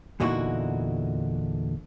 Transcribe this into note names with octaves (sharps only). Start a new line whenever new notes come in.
E2 A#2 D3 D#4 E4 F#4